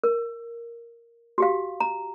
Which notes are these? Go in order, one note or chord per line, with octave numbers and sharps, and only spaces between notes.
A#4
F#4 G4 F5
A#5